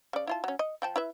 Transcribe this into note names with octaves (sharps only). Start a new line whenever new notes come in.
C#3 D5
E4 F4 A5
F#3 C#4
D#5
F3 G5 A5
E4 B4 E5